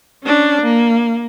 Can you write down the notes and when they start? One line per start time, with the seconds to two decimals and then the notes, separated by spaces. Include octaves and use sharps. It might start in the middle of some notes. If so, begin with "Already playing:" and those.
0.24 C#4 D4
0.62 A#3